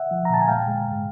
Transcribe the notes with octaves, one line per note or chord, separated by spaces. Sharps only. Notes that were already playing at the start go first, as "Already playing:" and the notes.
Already playing: E5 F#5
F3
A#5
A#2 A5
G#5
G#3 F5 G5
G#3
G#2